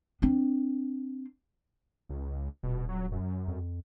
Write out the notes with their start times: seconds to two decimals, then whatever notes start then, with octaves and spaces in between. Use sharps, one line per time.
0.22 C4 D4
2.09 C#2
2.63 D#1 B2
2.89 F#3
3.12 F#2
3.48 F2